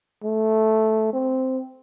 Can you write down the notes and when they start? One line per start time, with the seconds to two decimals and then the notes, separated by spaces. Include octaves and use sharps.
0.24 A3
1.13 C4